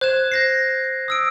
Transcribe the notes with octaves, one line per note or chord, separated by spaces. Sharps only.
C5 F#6 G#6 E7
G6 A#6 C7
D#6 E6 D7